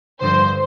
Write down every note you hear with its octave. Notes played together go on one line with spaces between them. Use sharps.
G2 D3 F3 C5